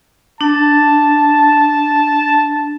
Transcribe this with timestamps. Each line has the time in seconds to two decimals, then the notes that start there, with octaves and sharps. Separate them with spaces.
0.41 D4 A5